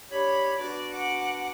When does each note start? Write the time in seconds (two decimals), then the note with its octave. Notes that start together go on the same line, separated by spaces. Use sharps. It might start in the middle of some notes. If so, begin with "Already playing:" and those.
0.11 D4 G4 C#5 B5
0.58 B3 D4 F#4 D5
0.91 F#5 D6